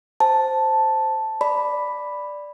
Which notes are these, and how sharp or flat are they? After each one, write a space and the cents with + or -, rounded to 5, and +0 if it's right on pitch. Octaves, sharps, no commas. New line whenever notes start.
C5 +0 A5 +0
D5 +0 B5 +0